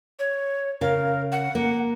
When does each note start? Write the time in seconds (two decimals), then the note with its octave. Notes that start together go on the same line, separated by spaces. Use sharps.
0.19 C#5
0.81 C#3 A#4 F5
1.32 F#5
1.55 A#3